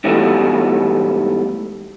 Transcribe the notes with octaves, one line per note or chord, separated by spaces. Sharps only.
G#2 B2 E3 G3 A3 B3